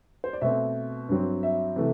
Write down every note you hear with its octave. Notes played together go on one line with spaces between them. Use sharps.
C5
D5
B2 A3 C4 E5
G2 F#3 C4
E5
C3 E3 A3